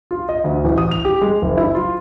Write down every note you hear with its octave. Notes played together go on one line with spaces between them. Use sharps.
F4
D#5
D2
A1
D#6
F7
G4
G#3
F#1
E4
F4